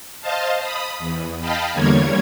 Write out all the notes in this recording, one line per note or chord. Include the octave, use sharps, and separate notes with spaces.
C5 D#5 F5 A5
B5 D#6
E2
D#5 F5 G5 A5 B5
E2 D3 G3 A#3 C#5 G#6